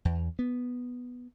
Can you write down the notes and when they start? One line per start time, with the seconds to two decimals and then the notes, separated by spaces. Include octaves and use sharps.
0.05 E2
0.39 B3